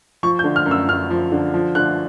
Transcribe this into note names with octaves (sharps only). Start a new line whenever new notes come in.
F3 C#6
G6
D3
F6
F#2
E6
F#2 F6
F3
D3
F3
D3 F#6